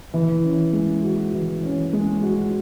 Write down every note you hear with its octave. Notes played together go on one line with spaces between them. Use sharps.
E3
C#4
G#3
F#4
E3
C#4
G#3
F#4